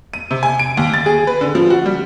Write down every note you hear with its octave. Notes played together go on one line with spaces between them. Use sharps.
D#7
C3
G#5
D7
D#2
A6
G#4
B4
D3
F3
F#4
G3